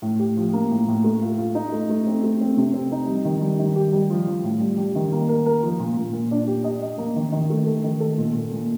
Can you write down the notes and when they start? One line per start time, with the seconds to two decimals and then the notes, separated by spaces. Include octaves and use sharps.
0.02 A2
0.19 G4
0.37 F3
0.53 A#3
0.71 A2
0.88 A2
1.04 A3
1.22 F4
1.38 F4
1.55 D#4
1.72 A3
1.89 A3
2.07 C4
2.24 A3
2.41 C4
2.57 C3
2.74 C4
2.92 D#4
3.08 G3
3.25 D#3
3.42 G3
3.59 D#3
3.76 G4
3.92 G3
4.10 F3
4.27 F3
4.44 A2
4.60 G3
4.77 G3
4.95 D#3
5.12 A#3
5.29 A#4
5.46 A#4
5.62 F3
5.79 A#2
5.97 A#2
6.13 A#2
6.31 D4
6.47 G4
6.64 D#5
6.82 D#5
6.98 A#3
7.16 D#3
7.32 D#3
7.50 A3
7.66 A4
7.84 D#3
8.00 A4
8.18 A#2
8.35 A#2
8.52 A#2